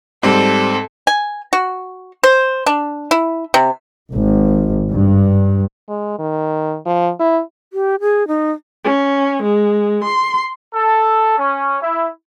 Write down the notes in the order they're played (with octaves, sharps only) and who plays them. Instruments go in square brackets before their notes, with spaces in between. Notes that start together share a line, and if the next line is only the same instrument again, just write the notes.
[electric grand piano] G#2 C4 [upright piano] G3 [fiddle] A4
[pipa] G#5
F#4
C5
D4
E4
C3
[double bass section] G#1
G2
[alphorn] G#3
D#3
F3
E4
[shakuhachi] G4
G#4
D#4
[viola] C#4
G#3
C6
[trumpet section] A4
C#4
E4